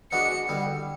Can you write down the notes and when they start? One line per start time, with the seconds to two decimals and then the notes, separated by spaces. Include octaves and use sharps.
0.12 E3 G#3 B3 D4 F#4 C#7
0.48 D3 G3 B3 E4